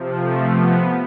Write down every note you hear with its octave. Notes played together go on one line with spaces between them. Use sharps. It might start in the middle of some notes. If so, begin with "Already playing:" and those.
Already playing: C3 F3
A3
B3